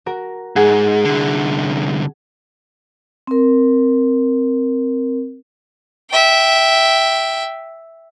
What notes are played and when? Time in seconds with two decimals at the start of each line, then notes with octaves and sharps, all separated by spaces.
0.06 F#4 A#4
0.56 G#2 G#4 F#5
1.05 C2 D3
3.27 C4 A#4
6.10 E5 G5